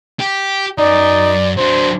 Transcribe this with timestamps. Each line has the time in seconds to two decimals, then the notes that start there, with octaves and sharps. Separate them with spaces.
0.20 G4
0.78 F#2 D#4 D5
1.57 F#3 D4 C5